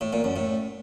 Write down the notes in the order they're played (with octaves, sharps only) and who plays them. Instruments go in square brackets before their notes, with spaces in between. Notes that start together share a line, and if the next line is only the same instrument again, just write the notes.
[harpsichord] A2
A#2
F#2
A2